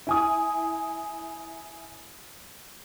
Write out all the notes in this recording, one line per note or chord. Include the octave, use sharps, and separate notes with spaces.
E4 G#5 D#6